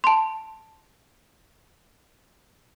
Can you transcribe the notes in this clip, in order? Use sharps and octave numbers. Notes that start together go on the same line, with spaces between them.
A5 C6